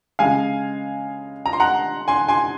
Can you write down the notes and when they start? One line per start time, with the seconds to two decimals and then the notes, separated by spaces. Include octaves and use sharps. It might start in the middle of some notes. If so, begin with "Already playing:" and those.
0.19 C#3 G#3 F5 G#5
1.46 A#5
1.53 C6
1.60 F#5 A#5
2.08 G#5 C6
2.29 G#5 C6